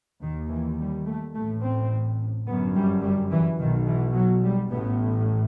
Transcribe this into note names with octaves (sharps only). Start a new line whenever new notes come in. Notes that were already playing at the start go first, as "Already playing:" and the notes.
D#2 D#3
E3
G3
A3
A1 A2 A3
C4
G1 F#2 B3
G3
G3
E3
B1 B2 D#3
E3
F#3
G3
A1 A2 B3